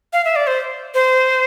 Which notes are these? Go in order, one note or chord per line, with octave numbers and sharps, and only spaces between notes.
F5
E5
D5
C5
C5